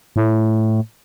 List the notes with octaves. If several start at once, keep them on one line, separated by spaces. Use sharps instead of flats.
A2